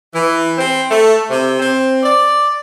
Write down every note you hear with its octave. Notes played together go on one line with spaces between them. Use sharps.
E3
C4
A3
C3
C4
D5